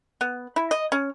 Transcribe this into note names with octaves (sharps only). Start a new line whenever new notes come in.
B3
E4
D#5
C#4